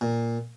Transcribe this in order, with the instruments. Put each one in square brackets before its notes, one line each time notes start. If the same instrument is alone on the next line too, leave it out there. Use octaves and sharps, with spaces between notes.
[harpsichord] A#2